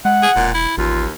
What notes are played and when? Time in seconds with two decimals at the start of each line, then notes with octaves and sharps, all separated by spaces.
0.05 G#3 F#5
0.23 G#4
0.36 E1 A#2
0.54 E4
0.78 A1 D#2 F4